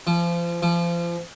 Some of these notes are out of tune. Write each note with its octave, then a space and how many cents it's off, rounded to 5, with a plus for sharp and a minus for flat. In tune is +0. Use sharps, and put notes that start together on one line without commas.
F3 -30
F3 -30